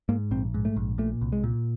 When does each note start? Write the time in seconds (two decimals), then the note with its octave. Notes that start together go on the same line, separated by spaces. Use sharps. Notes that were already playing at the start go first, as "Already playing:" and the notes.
0.09 G#2 A#3
0.31 A#1 C4
0.54 G#2
0.65 A3
0.76 A#1
0.98 A#2 A3
1.21 C2
1.32 G#3
1.44 A#2